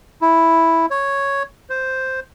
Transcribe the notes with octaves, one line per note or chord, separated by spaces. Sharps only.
E4
C#5
C5